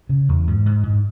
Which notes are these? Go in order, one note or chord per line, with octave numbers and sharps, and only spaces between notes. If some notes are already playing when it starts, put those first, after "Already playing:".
C#3
E2
G#2
G#2
G#2